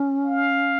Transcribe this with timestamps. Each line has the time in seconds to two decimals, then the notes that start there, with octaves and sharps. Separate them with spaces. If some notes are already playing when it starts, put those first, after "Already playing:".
Already playing: C#4
0.25 F5